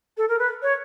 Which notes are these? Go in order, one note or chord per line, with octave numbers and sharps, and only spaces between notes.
A4
A#4
B4
C#5